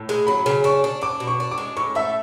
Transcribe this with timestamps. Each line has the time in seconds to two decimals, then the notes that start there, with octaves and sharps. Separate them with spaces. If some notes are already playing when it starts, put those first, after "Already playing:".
Already playing: A2
0.09 G#3
0.27 F#3 B5
0.46 C#3
0.64 D4 C#6
0.84 D4
1.01 D4 D6
1.20 B2
1.27 C#6
1.40 D4
1.51 D6
1.58 G#3
1.77 A2 C#6
1.95 A3 E5